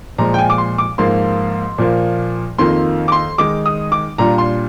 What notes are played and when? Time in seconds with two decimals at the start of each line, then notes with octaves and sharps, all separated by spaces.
0.18 A#2 F3 G#3 A#5
0.34 G5
0.38 G#5
0.50 D6
0.58 C6
0.78 D6
0.98 G#2 F3 A#3 F4 C6
1.78 A#2 F3 A#3 F4
2.58 F2 D#3 A#3 F4 C6
3.08 D6
3.12 C6
3.38 D#3 G#3 D#4 D6
3.66 D#6
3.92 D6
4.18 A#2 G3 D4 F4 A#5
4.38 C6